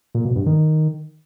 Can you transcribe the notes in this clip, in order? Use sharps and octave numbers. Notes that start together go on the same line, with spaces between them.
A#2
B2
G2
D#3